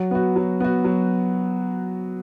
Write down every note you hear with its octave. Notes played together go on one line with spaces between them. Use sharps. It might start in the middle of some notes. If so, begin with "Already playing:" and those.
Already playing: F#3
B3 F#4
F#3
B3 F#4
F#3